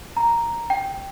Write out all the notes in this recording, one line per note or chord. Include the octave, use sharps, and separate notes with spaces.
A#5
G5